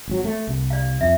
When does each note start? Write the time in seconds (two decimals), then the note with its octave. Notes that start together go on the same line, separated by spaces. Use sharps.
0.08 G#1 F#3
0.24 A3
0.47 C2
0.70 D5 F5
1.01 F2 E5